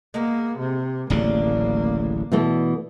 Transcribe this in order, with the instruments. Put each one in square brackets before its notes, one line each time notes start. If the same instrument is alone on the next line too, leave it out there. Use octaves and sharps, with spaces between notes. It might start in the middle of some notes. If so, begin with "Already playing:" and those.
[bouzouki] G#3 B3 [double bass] A#3
[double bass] C3
[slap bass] D1 A1 C#3 [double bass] A#3 [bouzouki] D4
[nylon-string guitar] B2 E3 A3